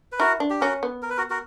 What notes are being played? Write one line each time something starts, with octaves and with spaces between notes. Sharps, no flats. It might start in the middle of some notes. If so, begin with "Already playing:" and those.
B4
E4 F#4 A#4
D4
G4
C#4 F#4 A#4
B3
A#4
B4
F#4 A#4
F#4 A#4